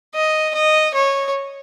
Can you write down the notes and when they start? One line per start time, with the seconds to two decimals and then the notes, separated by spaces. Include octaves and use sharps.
0.15 D#5
0.55 D#5
0.94 C#5